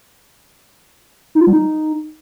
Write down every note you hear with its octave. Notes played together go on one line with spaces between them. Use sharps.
D#4
F4
G3
D#4